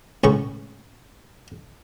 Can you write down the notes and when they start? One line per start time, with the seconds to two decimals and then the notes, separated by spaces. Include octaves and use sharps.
0.24 C#2 A2 C#6